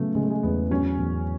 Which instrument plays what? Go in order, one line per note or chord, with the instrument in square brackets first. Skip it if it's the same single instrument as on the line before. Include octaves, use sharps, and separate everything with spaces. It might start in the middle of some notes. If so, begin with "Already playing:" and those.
Already playing: [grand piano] C#3 F#3 [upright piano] A3 B3
[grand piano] C#3 [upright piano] G#3
[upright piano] A3
G#3
[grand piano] E2 [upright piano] B3
[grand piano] F#3 [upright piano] C#4
[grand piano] E2